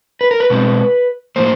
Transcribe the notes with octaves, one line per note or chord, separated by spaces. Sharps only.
B4
A#4
B4
B2 G#3 C4
A2 F3 A#3 C5